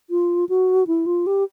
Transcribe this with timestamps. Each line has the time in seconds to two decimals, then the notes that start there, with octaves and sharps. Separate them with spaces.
0.10 F4
0.49 F#4
0.87 E4
1.06 F4
1.27 G4